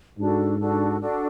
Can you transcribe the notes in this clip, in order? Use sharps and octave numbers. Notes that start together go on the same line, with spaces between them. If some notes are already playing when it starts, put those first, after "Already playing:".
G#2 D4 F#4 A4
D4 F#4 A4
D4 F#4 A4